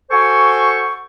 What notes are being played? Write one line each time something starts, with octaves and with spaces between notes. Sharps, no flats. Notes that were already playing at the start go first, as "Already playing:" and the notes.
F#4 A4 C5 G5 G#5 C#6